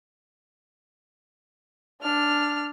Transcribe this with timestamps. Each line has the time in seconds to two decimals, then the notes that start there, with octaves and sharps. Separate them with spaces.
2.02 D4 F6